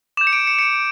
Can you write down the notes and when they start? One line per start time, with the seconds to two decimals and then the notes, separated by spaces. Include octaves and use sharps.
0.17 D6 G6 E7
0.27 C#7
0.33 D7
0.47 C#7
0.59 C#7
0.62 D7